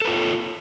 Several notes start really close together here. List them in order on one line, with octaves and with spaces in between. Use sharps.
A4 B4 F4 C#5